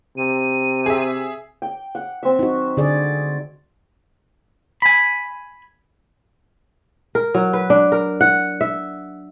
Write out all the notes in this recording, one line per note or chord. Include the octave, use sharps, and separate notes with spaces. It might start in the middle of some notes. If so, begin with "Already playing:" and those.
C3 D#7
G#4 E5
G5
F#5
C4 E5
D#4 F#4
D3 G#4 D5
G#5 B5
A#4
F#3
B4
D4
A#4
F#5
E5